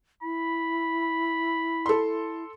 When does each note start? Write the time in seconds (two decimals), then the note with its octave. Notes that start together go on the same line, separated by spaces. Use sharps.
0.23 E4 B5
1.86 A4 C6